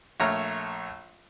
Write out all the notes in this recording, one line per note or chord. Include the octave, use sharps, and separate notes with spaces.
A#1 A3 C#5 A#5 F6